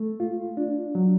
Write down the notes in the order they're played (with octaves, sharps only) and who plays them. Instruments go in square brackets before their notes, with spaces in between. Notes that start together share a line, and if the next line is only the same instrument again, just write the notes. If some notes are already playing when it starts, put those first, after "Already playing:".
Already playing: [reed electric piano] A3
F4
D4
F#3